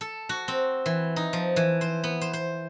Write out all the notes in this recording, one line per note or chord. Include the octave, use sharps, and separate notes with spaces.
A4
F#4
C4
E3
D#4
F3
E3
C5
B3
C5
C5